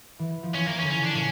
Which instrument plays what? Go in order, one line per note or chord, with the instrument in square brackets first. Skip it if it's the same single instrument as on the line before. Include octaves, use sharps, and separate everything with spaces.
[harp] E3
F3
[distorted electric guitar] C#4
[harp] E3 [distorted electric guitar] A#3
[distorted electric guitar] C#4
[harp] D3
[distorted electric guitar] C#4
[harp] C#3 [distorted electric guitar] D4
[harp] A#2 [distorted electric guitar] C#4